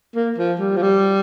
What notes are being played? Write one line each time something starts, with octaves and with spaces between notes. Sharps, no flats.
A#3
F3
G3
F3
G3